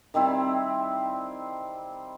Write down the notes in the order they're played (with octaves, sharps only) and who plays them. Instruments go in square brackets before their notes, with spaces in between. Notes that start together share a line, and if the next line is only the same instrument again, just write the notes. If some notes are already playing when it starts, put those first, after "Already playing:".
[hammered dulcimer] D#3 G3 C4 E4